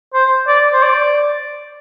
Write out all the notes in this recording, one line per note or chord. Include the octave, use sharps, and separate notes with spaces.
C5
D5
C5
D5